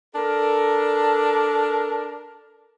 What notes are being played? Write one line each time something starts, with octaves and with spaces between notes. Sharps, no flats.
D4 A4 A#4